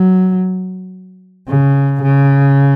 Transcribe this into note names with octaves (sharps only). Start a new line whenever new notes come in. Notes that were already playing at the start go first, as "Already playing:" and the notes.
Already playing: F#3
C#3
C#3